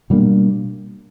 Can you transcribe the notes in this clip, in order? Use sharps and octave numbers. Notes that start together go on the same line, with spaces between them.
B2 G3 A#3 D4